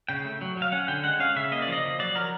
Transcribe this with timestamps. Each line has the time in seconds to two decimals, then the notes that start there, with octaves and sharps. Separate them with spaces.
0.09 C#3 G5
0.25 A3
0.41 F#3
0.57 F#3 F5
0.72 C#4 F#5
0.88 D3 G5
1.04 G#3 F#5
1.20 C#4 F5
1.36 C#3 E5
1.51 A#3 D#5
1.62 D5
1.68 F3 D#5
1.84 F3
1.99 F#3 D5
2.15 F#3 A#4